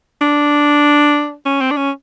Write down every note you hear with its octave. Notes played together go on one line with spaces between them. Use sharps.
D4
C#4
C4
D4
C#4